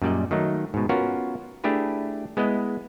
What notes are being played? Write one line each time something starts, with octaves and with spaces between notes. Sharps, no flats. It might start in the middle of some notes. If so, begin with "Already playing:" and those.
F#2 A#2 G3 D5 D#5
D#3 F#3 A3 D#4
G#2 B2
B3 C#4 F4 F#4 A#4
A3 D4 E4 G4 G#4 B4
G#3 B3 E4 D#5